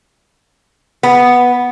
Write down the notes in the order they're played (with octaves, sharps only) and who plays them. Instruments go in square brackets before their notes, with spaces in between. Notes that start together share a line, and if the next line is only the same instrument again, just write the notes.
[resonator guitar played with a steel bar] B3